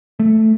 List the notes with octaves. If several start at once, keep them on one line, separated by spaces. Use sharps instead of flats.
A3